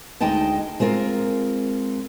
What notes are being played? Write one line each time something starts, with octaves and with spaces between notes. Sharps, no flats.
D2 G#3 D#4 D#5 G5 A5
G#3 C4 F4 A#4